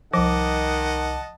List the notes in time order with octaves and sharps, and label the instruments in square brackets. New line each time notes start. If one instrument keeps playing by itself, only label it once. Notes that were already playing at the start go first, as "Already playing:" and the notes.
[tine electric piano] C2 D6 [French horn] D#3 [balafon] F3 [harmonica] D#5 F#5 A5